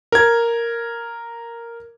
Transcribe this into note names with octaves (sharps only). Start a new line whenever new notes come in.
A#4 G#6